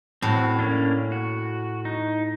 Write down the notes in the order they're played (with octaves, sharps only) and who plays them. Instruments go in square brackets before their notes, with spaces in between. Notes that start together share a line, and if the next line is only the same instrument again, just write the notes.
[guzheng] A2 [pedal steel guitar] C4 F#4
[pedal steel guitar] A#3 C#4 D4
F#4
D#4